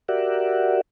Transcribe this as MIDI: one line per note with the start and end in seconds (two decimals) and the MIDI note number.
0.09 0.81 66
0.09 0.81 67
0.09 0.81 70
0.09 0.81 74
0.09 0.81 76
0.09 0.81 78